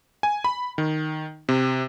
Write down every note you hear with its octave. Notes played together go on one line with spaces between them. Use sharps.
G#5
B5
D#3
C3